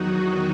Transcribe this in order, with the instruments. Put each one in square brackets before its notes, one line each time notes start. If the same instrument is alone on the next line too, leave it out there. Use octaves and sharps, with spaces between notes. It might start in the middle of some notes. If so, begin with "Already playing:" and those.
Already playing: [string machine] E2 D#3 F#3 D#4 F#4